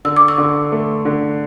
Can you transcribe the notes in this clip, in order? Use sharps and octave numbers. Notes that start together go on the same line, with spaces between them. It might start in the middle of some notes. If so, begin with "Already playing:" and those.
D3 E6
D6
C#6 E6
D3
A3
D3